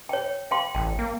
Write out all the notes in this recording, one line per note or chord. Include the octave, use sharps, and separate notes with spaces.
C#5 G5
F5 G5 C6
A1 G5
A#3